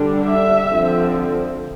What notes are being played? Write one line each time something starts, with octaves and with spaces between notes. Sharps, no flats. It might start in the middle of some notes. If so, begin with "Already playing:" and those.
Already playing: D3 G3 D4
E5
D3 F3 C4